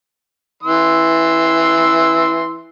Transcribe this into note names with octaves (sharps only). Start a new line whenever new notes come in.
E3 C6 E6